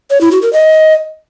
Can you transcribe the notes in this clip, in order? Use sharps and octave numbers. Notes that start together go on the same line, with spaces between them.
C#5
E4
F#4
A#4
D#5